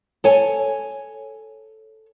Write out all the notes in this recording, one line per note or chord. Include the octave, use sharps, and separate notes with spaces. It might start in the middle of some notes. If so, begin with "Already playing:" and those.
A4 C#5 G#5